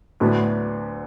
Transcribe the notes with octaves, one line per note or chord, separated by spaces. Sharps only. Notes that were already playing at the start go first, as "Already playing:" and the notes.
D2 A2 D3 F#3 B3 D4